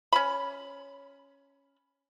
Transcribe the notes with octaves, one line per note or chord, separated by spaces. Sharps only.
C#4 B5